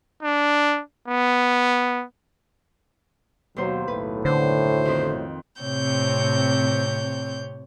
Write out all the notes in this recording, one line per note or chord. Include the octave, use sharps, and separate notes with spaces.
D4
B3
D#2 B2 F#3 C5
B1 A2 B4
D3 C5
F2 D#3
A2 C3 C4 C#5 G6